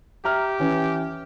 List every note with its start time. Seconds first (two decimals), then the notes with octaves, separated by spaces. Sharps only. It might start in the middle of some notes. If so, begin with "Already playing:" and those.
0.25 G4 E5 A#5 F6
0.60 E3 C#4